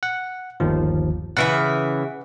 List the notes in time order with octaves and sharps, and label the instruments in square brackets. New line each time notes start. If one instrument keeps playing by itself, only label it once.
[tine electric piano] F#5
G1 D#2 F3
[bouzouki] C#3 E3 E5 [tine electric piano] F#5